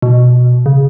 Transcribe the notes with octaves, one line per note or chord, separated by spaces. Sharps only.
B2
C#3